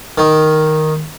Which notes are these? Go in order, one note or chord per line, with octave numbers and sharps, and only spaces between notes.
D#3